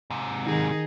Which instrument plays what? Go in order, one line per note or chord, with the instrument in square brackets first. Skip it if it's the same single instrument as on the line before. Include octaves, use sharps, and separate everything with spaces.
[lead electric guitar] G#2 C3
[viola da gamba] D#3 D#4 G#4